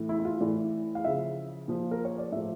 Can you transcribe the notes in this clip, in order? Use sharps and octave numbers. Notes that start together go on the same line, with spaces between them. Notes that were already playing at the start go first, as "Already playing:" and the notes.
Already playing: A2 E3
E4
E4
F4
A2 E3 D5
F5
C#3 F3 E5
A#2 F3
A#4
C#5
D5
A2 F3 E5